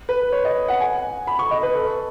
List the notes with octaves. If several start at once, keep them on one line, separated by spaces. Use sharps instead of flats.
B4
C#5
D#5
F#5
G#5
B5
C#6
D#5
B4
A4